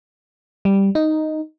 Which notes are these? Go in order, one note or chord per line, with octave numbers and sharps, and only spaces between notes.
G3
D#4